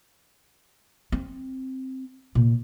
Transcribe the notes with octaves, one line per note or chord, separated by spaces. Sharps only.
C4
A#2